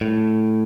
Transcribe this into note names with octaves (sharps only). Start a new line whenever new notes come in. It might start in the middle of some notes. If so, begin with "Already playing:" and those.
A2